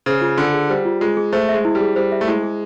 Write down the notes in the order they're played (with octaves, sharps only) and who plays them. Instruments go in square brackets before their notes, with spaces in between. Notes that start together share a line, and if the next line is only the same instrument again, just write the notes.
[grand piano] C#3 [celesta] C5
[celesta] F4
[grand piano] D3 [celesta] F4
[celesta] G#4
[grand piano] G3 [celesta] C5
[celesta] F4
[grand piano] G#3 [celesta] F4
[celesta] G#4
[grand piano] A3 [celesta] C5
[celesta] E5
[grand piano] G#3
[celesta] E4
[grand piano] G3
[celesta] G#4
[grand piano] G3 [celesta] C5
[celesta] E5
[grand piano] A3
[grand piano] G#3 [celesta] E4
[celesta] G#4